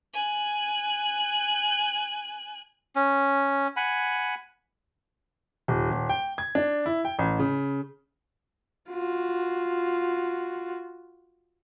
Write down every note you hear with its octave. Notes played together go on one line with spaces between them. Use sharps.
G#5 F#6
C#4
F#5 G#5 B5
D#1
D#1
G5
G#6
D4
E4
G5
A1
C#3
F4 F#4